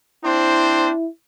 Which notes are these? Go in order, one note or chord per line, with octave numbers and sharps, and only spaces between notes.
C4 D4 E4 C5